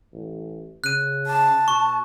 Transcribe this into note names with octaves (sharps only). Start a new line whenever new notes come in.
A1
C#3 F#6 D#7
A5
B2 C#6